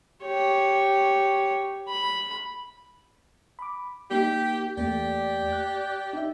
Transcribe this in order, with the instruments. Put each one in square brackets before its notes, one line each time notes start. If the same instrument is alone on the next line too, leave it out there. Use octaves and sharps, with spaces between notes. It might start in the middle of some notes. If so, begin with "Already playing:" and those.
[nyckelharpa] G4 C#5
B5
[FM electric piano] B5 D6
[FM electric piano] A#3 D#4 B6 [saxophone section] G4
[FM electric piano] E2 A3 A#3 [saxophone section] G4 D5
[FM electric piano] F#6
D#4 E5